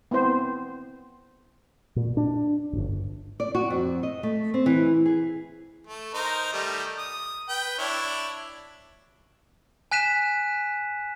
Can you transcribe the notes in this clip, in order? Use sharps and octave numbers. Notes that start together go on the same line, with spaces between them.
B3 C4 E4 C5
A#2
D4
D1 G1
D5
F#4
F2
D#5
A3
C4
E3
G#4
A3
D#4 A#4 C5
D#3 G3 A3
D#6
B4 G5
D4 E4 C#5
G#5 F#6 B6 D#7 E7